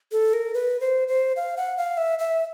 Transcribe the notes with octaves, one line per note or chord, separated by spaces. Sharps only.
A4
A#4
B4
C5
C5
F5
F#5
F5
E5
E5